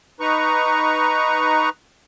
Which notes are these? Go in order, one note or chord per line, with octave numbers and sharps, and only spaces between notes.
D#4 B4 A#5 C#6